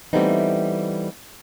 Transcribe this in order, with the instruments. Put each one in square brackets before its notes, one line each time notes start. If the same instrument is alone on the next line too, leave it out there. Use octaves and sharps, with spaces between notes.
[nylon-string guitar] E3 G3 A3 B3 C4 D#4